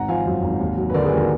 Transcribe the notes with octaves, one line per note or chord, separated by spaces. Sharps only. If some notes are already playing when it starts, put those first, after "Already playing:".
Already playing: G#1 F#5 A#5
F3 F5 G#5
F#2
G#1
D#2
F#3
B4
D3 A#4 D5
G#4 B4
D#2
F#4 A#4